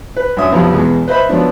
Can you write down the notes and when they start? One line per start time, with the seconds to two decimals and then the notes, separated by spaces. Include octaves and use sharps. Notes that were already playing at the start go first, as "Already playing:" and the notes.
0.16 B4
0.37 F#2 D4 E5 D#6
0.52 B1 F2 C3 F3
0.74 E2 B2 G#3
1.08 B4 C5 D#5 E5 B5
1.29 F3 F#3 B3 D4